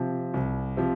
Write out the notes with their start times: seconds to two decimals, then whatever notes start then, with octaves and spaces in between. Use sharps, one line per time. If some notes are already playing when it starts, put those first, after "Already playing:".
Already playing: C3 F3
0.34 C2
0.77 C3 F3